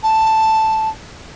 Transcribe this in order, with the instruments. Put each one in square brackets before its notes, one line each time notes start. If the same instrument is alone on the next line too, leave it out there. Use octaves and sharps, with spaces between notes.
[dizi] A5